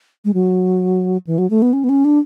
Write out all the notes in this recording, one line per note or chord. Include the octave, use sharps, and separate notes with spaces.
G#3
F#3
E3
F#3
A3
B3
C#4
B3
C#4
D4